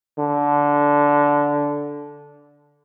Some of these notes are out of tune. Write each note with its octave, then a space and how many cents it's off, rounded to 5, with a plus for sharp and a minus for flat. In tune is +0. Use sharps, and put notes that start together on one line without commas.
D3 -10